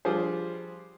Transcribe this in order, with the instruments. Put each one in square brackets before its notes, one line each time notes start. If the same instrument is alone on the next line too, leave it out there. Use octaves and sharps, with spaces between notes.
[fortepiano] F3 G3 D4 F4 G#4 C5